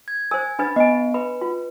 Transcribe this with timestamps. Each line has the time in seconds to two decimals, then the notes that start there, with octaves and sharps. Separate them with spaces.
0.08 G#6
0.31 A#4 C5 G#5
0.59 D4 B4 B5 A6
0.76 B3 D#5 G#5
1.14 B4 B5
1.41 F4